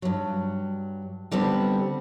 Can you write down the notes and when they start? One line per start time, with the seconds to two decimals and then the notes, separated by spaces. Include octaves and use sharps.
0.02 G2 F#3
1.31 D3 G3 B3 C4